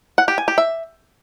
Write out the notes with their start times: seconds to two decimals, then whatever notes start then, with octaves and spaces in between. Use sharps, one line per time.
0.18 F#5
0.28 G4
0.38 G#5
0.48 G4
0.58 E5